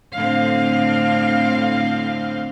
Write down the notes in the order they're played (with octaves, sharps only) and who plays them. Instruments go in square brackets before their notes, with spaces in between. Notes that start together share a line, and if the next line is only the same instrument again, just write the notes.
[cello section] A2 D3 C4 F5